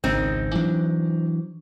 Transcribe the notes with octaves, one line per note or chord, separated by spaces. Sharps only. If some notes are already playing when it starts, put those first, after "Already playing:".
G#1 C#2 C4 D#4
E3 F#3 D4